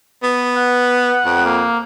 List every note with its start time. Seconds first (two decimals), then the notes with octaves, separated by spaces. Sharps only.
0.23 B3
0.56 F#5
1.26 F2
1.45 A#3